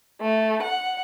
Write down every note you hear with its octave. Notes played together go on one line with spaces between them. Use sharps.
A3
F#5